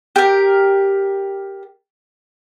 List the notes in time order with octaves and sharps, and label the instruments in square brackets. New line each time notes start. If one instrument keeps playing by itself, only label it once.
[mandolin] G4 A#4